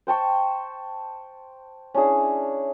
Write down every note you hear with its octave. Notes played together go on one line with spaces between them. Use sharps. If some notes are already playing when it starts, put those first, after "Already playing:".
C5 G5 A5 C#6
C#4 D4 E4 G#4